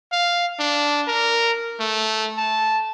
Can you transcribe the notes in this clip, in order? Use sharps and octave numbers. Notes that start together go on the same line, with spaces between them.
F5
D4
A#4
A3
A5